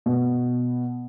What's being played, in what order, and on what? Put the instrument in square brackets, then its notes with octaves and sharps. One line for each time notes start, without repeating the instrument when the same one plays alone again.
[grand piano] B2